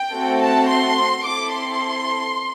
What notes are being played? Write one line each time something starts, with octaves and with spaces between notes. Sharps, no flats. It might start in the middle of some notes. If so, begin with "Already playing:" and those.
Already playing: G5
A3 C4 F#4 A4
A5
C6
C4 E4 A4 D6
C6